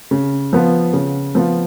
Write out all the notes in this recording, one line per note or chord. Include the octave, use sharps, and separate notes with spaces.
C#3
F3 B3 F4
C#3
F3 B3 F4